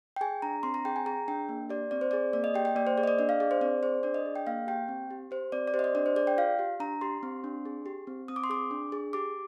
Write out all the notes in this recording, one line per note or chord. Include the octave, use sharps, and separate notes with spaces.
G5
G#4 G#5
D4 A#5
C4 C6
A#5
G#4 G5
G#5
G#4 A#5
D4 G5
A#3
G4 D5
C4 D5
C5
G#4 D5
A#3 D5
D#5
G4 G5
G5
A#3 D5
C5
G#4 D5
D#5
D5
D4 D#5
F5
G#4 D5
C5
C4 D5
G#4 C5
D4 D5
D#5
G#4
G5
A#3 F5
G4 G5
C4
G4
G4 C5
C4 D5
D5
G4 C5
D#5
D5
D4 D5
C5
G#4 D5
G5
F4 F5
G4
D4 A#5
G4 C6
C4
D4
G#4
G4
C4
C4 D#6
D6
C6
G#4 D6
D4
G#4
G4 D6